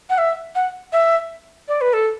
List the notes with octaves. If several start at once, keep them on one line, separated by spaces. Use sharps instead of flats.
F#5
E5
F#5
E5
D5
B4
A4